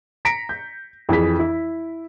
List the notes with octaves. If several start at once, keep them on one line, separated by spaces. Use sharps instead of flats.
A#5 A#6 B6 C#7 D7
G6
F2 E3 G#4 B6
E4